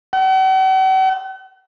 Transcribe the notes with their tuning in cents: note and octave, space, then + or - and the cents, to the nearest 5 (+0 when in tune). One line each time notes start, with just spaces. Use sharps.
F#5 +45